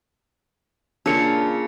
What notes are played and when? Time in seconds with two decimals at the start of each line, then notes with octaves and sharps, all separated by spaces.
1.06 C#3 A#3 D4 F4 C#7